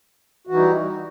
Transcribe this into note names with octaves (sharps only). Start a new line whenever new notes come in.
E3 G3 D#4 F#4